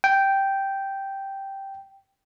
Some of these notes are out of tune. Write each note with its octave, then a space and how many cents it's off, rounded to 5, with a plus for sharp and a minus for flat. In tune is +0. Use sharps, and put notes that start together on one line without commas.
G5 -5